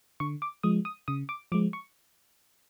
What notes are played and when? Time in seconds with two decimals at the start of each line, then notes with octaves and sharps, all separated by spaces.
0.20 D3 C#6
0.42 D6
0.63 F3 G#3 D#6
0.85 D#6
1.08 C#3 D#6
1.29 D6
1.52 F3 G#3 D6
1.73 C#6